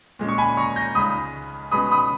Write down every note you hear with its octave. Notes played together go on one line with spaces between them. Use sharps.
A#2 G#3 C#4
C#6
G#5 B5
A#5 C#6
G6 A#6
C#2 C#3 G#3 D#4 B5 D#6
B2 G#3 C#4 B5 D#6
B5 D#6